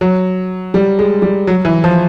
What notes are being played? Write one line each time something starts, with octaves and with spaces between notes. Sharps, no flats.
F#3
G3
G#3
G3
F#3
E3
F3